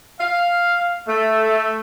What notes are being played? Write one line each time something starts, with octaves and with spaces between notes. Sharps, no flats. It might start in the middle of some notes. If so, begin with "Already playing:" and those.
F5
A3